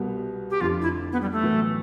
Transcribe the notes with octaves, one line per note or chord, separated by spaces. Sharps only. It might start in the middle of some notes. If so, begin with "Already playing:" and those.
Already playing: C2 B2 G3 B3
G4
F1 F2 D3 F4
E4
B3
G3
A3
B1 A2 E3 B3 E4